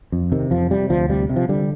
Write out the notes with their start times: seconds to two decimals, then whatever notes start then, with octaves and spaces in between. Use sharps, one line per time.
0.12 F2
0.32 C3 D#3
0.51 F2 F3
0.70 C3 G3
0.90 D2 F3
1.10 C3 G3
1.30 C3
1.36 F3
1.49 D3 G3